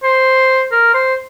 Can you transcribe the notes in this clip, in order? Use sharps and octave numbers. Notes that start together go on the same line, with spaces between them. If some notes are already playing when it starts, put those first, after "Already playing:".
C5
A#4
C5